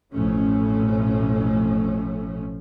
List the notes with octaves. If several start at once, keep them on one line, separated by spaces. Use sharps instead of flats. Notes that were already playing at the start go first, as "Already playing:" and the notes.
A1 F2 B2 F3 A3 C#4